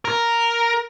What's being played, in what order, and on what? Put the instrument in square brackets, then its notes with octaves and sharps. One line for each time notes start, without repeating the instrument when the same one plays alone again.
[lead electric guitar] A#4